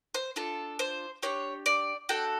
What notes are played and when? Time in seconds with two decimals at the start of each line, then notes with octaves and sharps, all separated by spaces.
0.14 C5
0.36 D4 F4 A4
0.79 C5
1.22 D4 G4 C#5
1.66 D5
2.09 D4 F#4 A4 G5